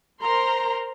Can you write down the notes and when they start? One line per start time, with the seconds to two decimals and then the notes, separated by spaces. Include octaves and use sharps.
0.21 A#4 C5 A#5 C6